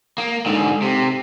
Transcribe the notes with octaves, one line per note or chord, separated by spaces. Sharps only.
A#3
G#2 D3
C3